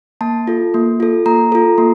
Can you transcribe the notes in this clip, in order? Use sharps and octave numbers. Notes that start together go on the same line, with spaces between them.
A#3 A5
F4 A4
A#3
F4 A4
A#3 A#5
F4 A4
A#3